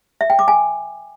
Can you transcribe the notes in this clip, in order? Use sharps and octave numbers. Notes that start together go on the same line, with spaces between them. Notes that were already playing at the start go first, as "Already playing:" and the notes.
E5
G5
D6
G#5